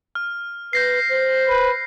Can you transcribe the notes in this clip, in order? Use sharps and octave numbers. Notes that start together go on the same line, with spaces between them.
F6
B4 G6 A#6 C7
C5
B4